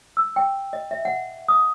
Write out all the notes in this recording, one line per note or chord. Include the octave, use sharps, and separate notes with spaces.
E6
G5
D#5
E5
F#5
D#6